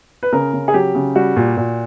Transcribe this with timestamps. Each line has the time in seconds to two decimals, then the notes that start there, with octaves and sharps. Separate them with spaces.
0.23 B4
0.33 C#3 A#4
0.53 C#3
0.68 G#4
0.74 F#3 G4
0.95 C#3
1.15 G3 F#4
1.36 A#2
1.57 A#2